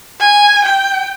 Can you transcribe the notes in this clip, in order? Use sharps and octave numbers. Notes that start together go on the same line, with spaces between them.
G#5
G5